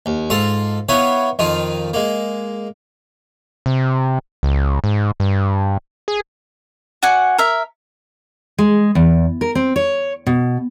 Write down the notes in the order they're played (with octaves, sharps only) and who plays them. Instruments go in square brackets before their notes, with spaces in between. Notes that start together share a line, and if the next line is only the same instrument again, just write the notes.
[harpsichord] D#2
G#2 F4 A4 F5
B3 E4 B4 C#5 F5 G#5
F2 D#3 D#4 F4
G#3 A#3
[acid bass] C3
C#2
G#2
G2
G#4
[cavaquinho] F#4 D5 F#5 G#5
A#4 E5
[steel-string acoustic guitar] G#3
E2
A#4
C4
C#5
B2